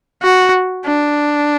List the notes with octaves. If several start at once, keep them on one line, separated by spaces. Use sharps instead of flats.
F#4
D4